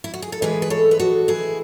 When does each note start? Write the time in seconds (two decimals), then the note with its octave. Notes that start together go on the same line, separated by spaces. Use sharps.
0.04 E4
0.14 F#4
0.22 G#4
0.32 A4
0.42 A2 E3 G#3 G#4 B4
0.62 B4
0.70 A4 C#5
0.91 B4
1.00 F#4 A4
1.28 E4 G#4